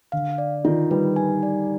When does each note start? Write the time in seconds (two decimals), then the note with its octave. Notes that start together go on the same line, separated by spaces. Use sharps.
0.12 D3 F5
0.38 D5
0.65 D#3 F4
0.91 G3 B4
1.16 G#5
1.43 D5